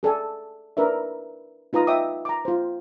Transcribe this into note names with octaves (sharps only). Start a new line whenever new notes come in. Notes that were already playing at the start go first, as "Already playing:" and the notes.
G#4 A4 D5 G#5
D4 E4 A#4 B4 D5 E5
D#4 F4 B4 A#5 D#6
C#5 D#5 E5 G5 D6 D#6
A#5 D6
F4 C5